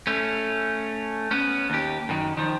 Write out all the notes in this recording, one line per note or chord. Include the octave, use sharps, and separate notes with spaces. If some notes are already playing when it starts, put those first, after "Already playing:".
A3 C#4
B3 C#4
D#2 G4
F#2 D#3
D#3 F3